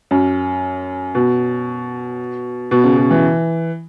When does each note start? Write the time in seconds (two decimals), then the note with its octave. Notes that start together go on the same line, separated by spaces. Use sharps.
0.11 F#2
1.15 B2
2.71 B2
2.84 C#3
2.97 B2
3.11 E3